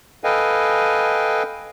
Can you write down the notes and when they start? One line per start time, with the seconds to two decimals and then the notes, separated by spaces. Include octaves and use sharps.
0.24 A4 B4 D#5 F5 G5 G#5